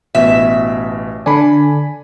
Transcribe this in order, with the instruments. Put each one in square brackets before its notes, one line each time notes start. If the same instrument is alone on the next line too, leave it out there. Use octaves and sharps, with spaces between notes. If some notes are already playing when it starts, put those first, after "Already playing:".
[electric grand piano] A1 B2 [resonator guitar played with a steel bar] E5
[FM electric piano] D3 D4 [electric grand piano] G#5 B5